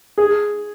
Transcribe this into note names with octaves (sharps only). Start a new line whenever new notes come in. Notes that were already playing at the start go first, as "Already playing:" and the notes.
G#4